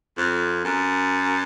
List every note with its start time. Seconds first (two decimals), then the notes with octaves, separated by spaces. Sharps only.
0.18 F2
0.65 F#2